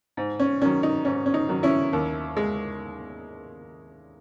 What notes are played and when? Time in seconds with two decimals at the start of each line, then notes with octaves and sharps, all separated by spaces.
0.17 G#2
0.40 C#4
0.62 D#3 F#3 C#4
0.83 D#4
1.05 G#2 C#4
1.26 C#4
1.34 D#4
1.49 D#3 F#3
1.63 C#4 E4
1.93 D#2
2.37 G#3